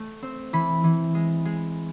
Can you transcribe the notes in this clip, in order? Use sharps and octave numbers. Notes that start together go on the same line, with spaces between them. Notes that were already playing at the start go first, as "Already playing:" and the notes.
Already playing: A3
C4
E3 B5
E3
G#3
G#3